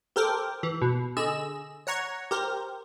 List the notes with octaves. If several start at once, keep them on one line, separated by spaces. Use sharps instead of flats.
G4 A4 A#4 C5 G5
E3
B2
D3 G#4 D#5 E6 E7
C#5 F#5 A#5 C#6
G4 A#4 C5